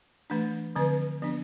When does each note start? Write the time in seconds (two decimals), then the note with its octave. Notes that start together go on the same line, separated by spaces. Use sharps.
0.30 E3 A3 D4
0.76 D3 F3 C4 B4
1.22 F3 B3 D4